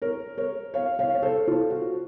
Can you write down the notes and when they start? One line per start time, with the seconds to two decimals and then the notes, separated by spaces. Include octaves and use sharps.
0.02 A#4 C#5
0.37 A#4 C#5
0.74 C#5 F5
0.99 C#5 F5
1.14 C#5
1.22 A4 C5
1.48 F4 A4
1.71 F#4